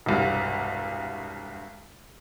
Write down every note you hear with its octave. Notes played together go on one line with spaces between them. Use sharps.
E1 C2 G2